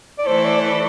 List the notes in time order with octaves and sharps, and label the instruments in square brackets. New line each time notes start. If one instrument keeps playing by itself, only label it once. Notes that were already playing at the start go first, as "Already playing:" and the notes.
[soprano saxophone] D5
[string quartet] E3 A3 E4 A4 [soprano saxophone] C5
[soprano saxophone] D5
C5
D5